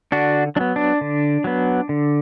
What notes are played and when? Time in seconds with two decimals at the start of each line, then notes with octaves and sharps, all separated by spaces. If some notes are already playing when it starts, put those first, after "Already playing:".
0.12 D3 D4 F#4
0.56 F#3 D4
0.61 B3
0.76 D4
1.01 D3
1.44 F#3 B3
1.89 D3